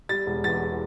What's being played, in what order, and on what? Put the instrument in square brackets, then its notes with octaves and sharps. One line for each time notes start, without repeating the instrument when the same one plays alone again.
[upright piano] G3 A6
E1
E2 A6